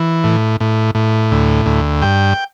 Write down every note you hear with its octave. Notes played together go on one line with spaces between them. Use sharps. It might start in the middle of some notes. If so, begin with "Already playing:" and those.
Already playing: E3
A2
A2
A2
D2
D2
G2 G5